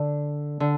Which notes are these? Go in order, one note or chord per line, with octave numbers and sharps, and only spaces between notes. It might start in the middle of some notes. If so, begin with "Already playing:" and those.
Already playing: D3
D3